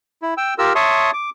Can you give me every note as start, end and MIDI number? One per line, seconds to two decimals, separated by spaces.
0.22 0.34 64
0.37 0.54 79
0.37 0.54 88
0.58 0.73 65
0.58 0.73 67
0.58 0.73 70
0.58 0.73 88
0.75 1.11 73
0.75 1.11 76
0.75 1.11 81
0.75 1.11 84
0.75 1.11 85
0.75 1.11 87
1.13 1.30 86